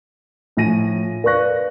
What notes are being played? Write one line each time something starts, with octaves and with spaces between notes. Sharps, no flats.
A2 F3 G#5 A#6 D#7
B4 D5 F5 C#6 F#6 A#6